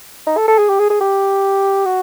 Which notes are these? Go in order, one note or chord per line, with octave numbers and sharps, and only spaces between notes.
D#4
A4
A4
G#4
G4
G#4
G#4
G4
F#4